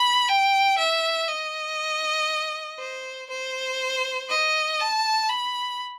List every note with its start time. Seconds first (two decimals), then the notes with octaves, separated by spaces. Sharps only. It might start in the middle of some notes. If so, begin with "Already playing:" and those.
Already playing: B5
0.28 G5
0.78 E5
1.28 D#5
2.79 C5
3.30 C5
4.29 D#5
4.80 A5
5.29 B5